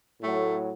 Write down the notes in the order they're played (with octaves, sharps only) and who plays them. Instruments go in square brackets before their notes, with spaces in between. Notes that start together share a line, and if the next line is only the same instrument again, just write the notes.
[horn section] A2 F#3 A3